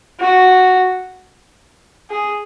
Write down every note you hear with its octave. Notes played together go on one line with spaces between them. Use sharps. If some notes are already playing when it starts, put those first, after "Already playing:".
F#4
G#4